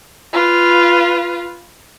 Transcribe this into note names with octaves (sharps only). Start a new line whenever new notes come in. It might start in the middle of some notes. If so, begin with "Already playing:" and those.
F4 B4